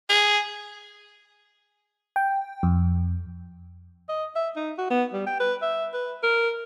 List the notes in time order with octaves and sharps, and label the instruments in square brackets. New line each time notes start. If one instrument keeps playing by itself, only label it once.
[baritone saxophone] G#4
[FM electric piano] G5
F2
[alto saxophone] D#5
E5
D#4
F#4
B3
G3
G5
B4
E5
B4
A#4